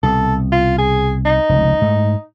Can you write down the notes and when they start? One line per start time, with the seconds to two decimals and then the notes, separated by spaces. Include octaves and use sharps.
0.03 C2 B2 A4
0.52 F4
0.78 G#4
1.25 D#4
1.49 F1 C#2
1.82 G#2 A3